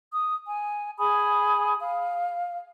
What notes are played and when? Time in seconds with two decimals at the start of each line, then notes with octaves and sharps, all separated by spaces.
0.13 D#6
0.48 G#5
0.99 G#4 G#5 B5 D#6
1.82 F5